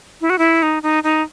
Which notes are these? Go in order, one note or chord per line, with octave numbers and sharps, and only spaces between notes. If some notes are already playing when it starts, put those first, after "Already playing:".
E4
F#4
E4
D#4
D#4
D#4